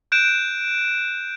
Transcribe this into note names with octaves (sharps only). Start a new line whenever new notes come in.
F#6 G6 D7 E7